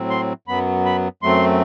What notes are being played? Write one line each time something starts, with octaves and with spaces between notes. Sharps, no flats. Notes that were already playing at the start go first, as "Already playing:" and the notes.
Already playing: A2 F#3 C4
C6
F#2 F#3 B3 B5
B5
F#2 F#3 A3 C4 C6